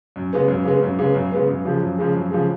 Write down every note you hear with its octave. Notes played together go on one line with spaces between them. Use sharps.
F#2
C#3 G#3 B3
F#2
C#3 G#3 B3
F#2
C#3 G#3 B3
F#2
C#3 G#3 B3
F#2
C#3 F3 G#3
F#2
C#3 F3 G#3
F#2
C#3 F3 G#3